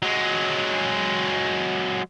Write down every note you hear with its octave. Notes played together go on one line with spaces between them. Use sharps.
F#3 G#3